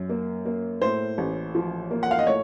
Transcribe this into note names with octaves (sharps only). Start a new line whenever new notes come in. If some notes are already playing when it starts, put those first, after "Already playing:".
Already playing: F#2
A#3
A#3
A2 C5
A1
F3
A#3
F#5
F5
D#5
A2 C#5